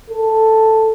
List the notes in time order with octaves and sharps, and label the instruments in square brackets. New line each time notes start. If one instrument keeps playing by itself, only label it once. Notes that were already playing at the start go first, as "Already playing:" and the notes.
[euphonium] A4